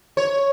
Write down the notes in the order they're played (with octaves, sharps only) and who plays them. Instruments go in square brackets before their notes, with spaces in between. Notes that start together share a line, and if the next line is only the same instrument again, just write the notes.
[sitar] C#5